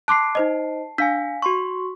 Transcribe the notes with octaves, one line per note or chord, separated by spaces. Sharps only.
A5 C6 D6 F#6 C7
D#4 C5 D#5
D4 F5 G#5 B6
F#4 C6 C#6